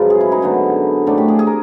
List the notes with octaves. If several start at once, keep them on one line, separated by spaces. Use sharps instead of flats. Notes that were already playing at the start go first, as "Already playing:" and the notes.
Already playing: F#2 C#3 F3 G#3 B4
G#4
E4
D#4
D3 F#3 B3
A2 F#3 A3 C4 D4
G4
G#4
G#4
A#4